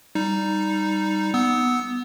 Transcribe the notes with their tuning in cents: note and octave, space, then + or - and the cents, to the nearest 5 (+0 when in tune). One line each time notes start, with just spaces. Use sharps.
G3 +0 D#4 +0
B3 +0 E6 -20